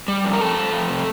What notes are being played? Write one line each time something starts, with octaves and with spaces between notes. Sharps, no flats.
G3
F2
A#4
F2 A3 A4
F2
F2
C3